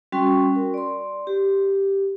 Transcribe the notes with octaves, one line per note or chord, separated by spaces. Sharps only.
G3 C#4 F#4 G5 C6 C#6
A#4
D5 C6
G4